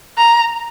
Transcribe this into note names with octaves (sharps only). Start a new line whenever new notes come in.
A#5